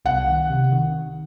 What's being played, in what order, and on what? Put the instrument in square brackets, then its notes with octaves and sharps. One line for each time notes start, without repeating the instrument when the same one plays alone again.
[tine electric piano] C2 [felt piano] F#5
[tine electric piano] D#3
C3
D#3